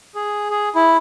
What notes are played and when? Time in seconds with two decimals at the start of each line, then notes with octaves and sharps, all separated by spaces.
0.15 G#4
0.50 G#4
0.76 E4